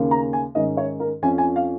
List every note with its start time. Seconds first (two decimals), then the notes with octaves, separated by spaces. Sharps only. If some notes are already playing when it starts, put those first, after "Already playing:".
Already playing: D#2 C#3 A#3 C#4
0.11 A#5
0.33 G#5
0.55 G#2 D#3 C#4 D#5
0.77 C#5
1.00 A#4
1.22 F2 F3 C#4 G#5
1.38 G#5
1.56 F5